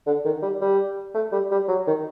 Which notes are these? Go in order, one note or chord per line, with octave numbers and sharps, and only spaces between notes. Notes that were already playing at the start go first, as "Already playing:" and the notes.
D3
D#3
G3
G3
A3
G3
G3
F#3
D#3